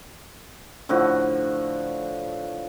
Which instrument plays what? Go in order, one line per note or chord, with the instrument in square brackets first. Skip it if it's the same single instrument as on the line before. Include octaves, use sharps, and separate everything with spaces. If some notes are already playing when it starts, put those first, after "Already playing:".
[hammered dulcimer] A2 D3 F3 F#4